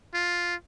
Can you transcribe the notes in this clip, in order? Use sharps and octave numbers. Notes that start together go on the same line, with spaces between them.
F4